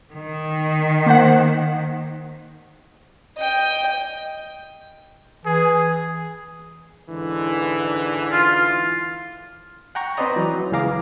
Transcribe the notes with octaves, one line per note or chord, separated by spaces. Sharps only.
D#3
A#3 C5 F#5
D#5 G5
E3 G#4
G#2 D3 E3
F4
F#5 G5 A#5 C#6
C4 B4 C5 D5 D#5 A#5
E3 F#3
C#2 E3 G#4 F5 A#5 D6